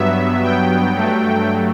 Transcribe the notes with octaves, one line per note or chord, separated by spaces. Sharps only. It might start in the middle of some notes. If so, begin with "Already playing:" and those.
Already playing: G2 F#3 B3 E5
G5
G2 F#3 A3